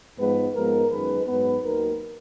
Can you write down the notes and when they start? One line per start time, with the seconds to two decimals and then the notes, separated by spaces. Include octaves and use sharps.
0.18 G#2 F3 G#3 B3 B4
0.55 G#2 F3 G#3 B3 A#4
0.90 F#2 D#3 G#3 B4
1.25 G#2 F#3 B3 B4
1.61 D#2 D#3 F#3 A#4